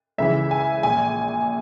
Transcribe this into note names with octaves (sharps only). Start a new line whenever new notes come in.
C#2 C#3 E3 E5
G#5
A#1 A#2 G#5